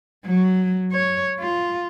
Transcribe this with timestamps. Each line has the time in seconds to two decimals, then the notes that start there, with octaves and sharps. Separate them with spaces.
0.24 F#3
0.92 C#5
1.39 F4